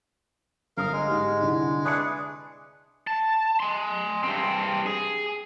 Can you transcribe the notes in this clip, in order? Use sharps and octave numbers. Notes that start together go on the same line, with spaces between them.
G1 A#4 F5 D#6
G#3
G#2 G4
C2 D3 E4
D4 G#4 B4 E5 C#6 C#7
A5
G#5 C6
G2 C4
G#4